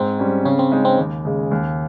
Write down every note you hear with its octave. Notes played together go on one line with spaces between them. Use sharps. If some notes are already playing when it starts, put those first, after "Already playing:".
Already playing: G#2 C4
G3 C#4
C#3 C#4
C4
G#3 D#4
C4
D#2
C#3 G#3
D#2